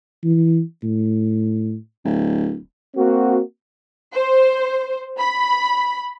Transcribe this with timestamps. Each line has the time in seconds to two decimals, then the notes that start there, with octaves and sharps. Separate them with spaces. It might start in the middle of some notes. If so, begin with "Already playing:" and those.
0.24 E3
0.83 A2
2.05 D1
2.95 A#3 C4 F#4
4.15 C5
5.19 B5